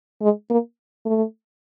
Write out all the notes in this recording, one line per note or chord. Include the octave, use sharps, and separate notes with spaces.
G#3
A#3
A3